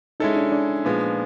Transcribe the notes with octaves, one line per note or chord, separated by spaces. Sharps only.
G#3 C#4 D#4 E4 A4
D4
D4
A#2 F3 G#3 B3